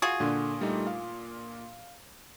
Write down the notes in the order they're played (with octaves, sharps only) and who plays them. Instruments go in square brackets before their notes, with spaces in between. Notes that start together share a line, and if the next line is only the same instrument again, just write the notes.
[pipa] F4 F#4 G#4
[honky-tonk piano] A#2 D4 [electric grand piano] D3
[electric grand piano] G3 A3 D#4
F5